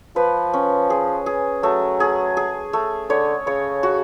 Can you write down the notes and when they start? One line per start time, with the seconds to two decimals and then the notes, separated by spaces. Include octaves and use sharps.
0.16 F3 B4
0.53 C#4
0.90 G#4
1.26 G#4
1.63 F#3 A3
2.00 G#4
2.37 G#4
2.73 A3
3.09 D3 C#5
3.46 C#3 C#5
3.83 F#4